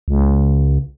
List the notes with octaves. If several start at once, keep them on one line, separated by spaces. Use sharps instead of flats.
C#2